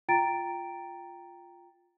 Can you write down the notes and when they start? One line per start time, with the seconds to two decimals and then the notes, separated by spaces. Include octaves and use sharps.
0.09 F4 G5 A#5 A6 D7